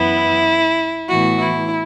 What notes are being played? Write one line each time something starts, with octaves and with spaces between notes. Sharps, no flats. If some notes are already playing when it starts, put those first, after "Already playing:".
Already playing: F#2 E3 B3 E4
A2 E3 B3 F#4
E4